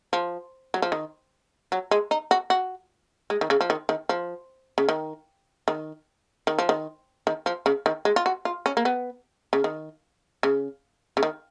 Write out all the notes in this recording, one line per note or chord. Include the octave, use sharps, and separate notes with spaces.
F3
F#3
F3
D#3
F#3
G#3
D#4
F#4
F#4
G#3
D#3
C#3
F3
D#3
D#3
F3
C#3
D#3
D#3
D#3
F3
D#3
D#3
F3
C#3
D#3
G#3
F4
F#4
F4
C#4
A#3
B3
C#3
D#3
C#3
C#3
D#3